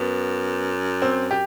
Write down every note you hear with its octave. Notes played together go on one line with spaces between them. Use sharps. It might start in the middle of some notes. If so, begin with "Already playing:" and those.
Already playing: F#2 B3
C4
G4